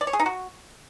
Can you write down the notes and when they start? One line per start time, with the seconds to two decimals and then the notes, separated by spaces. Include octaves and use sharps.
0.01 D5
0.07 C#5
0.13 G#4
0.20 D#4
0.26 F#4